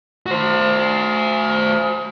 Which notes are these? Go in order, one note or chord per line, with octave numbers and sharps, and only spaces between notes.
F#4 C5